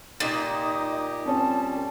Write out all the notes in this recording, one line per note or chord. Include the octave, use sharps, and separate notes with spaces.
A#2 D#4 G4 D#5
G3 C4 C#4 A5